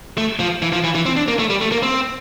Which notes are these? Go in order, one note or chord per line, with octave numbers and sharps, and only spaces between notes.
A3
F3
E3
F3
E3
E3
C4
D4
A#3
A3
G3
A3
A#3
C4